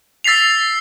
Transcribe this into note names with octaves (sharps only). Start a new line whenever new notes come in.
E6 A6 B6 C7 F7